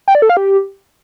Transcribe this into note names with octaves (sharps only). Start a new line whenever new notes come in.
G5
D5
A4
F5
G4